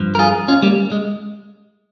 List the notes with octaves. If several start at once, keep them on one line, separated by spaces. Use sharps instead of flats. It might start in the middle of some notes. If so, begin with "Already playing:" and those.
Already playing: G2 F3
A#4
F4 G#4
C#4 F4
G3 A#3
G#3